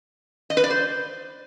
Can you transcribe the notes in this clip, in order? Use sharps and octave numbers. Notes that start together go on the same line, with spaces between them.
D#5
B4
D5
C5